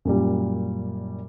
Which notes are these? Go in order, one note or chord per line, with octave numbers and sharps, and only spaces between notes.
F#2 A#2 G3